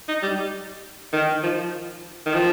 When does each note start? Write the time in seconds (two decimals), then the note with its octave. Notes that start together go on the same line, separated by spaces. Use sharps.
0.08 D#4
0.22 G3
1.13 D#3
1.43 F3
2.26 D#3
2.34 F3